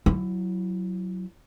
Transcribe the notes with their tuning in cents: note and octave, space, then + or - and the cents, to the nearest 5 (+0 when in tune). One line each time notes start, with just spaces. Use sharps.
F#3 +0 E4 +15